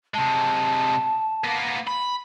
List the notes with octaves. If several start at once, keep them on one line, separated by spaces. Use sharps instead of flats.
C3 G#3 A5
A#3 B3
B5